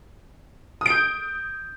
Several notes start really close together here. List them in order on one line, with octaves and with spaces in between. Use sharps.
D#6 D7 G6